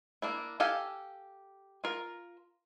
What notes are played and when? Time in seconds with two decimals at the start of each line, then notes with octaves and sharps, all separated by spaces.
0.22 A#3 D4 E4
0.60 G4 A4 F5 G#5
1.84 F4 A#4